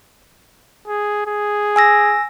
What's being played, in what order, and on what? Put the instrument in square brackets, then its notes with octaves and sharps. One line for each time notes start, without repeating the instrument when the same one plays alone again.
[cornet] G#4
G#4
[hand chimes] G#5 E6 A#6